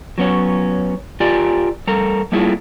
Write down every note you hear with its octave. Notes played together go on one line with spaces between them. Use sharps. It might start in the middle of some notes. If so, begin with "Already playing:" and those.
F#3 B3 C#4 C#5
F4 G4 A#4 D5 G#5
G3 A4 A#4 A#5
G3 A3 A#3 E4 F4 G#4